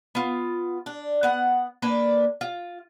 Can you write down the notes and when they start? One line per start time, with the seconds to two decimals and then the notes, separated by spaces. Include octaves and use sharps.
0.15 B3 F4
0.86 D4
1.23 B3 F#5
1.82 A#3 D4 B4
2.41 F4